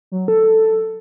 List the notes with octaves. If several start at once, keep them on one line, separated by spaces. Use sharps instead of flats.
F#3
A4